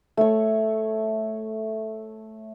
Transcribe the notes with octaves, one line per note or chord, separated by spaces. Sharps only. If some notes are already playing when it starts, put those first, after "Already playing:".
A3 C#5